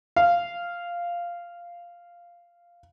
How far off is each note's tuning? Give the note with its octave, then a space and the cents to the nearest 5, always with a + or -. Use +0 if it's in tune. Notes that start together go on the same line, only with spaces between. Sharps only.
F5 -5